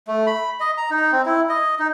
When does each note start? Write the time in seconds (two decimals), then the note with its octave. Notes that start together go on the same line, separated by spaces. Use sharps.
0.08 A3
0.27 B5
0.60 D#5
0.78 A#5
0.91 D#4
1.12 C4
1.26 E4
1.49 D#5
1.79 D#4